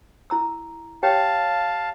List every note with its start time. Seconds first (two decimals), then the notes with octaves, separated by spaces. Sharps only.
0.30 E4 A#5 E6
1.03 G4 C#5 F5 G5 A5